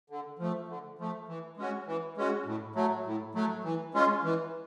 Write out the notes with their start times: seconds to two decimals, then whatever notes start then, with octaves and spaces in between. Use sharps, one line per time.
0.10 D3
0.39 F3 A3
0.68 D3
0.99 F3 A3
1.28 E3
1.57 G#3 C#4 F#4
1.87 E3
2.17 G#3 C#4 F#4
2.46 A2
2.76 F#3 A3
3.06 A2
3.35 F#3 A3
3.64 E3
3.94 G#3 C#4 F4
4.24 E3